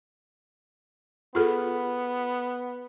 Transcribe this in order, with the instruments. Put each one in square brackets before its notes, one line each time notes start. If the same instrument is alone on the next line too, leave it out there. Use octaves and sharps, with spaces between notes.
[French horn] B3 [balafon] F4 G#4 A4